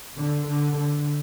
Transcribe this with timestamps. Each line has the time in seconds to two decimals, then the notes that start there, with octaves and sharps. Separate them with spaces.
0.18 D3
0.48 D3
0.76 D3